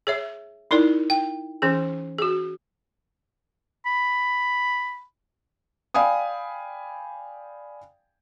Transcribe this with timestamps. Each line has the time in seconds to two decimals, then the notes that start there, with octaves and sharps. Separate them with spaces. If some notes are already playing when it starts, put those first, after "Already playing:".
0.07 G#4 C#5 E5
0.71 D#4 E4 A#4 D5
1.10 G5
1.62 E3 C#4 G#4
2.18 F#4 G#4
3.86 B5
5.94 D5 F5 G5 G#5 B5 D#6